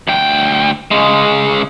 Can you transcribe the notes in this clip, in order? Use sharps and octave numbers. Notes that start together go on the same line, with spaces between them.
D2 G5
C#3 G#3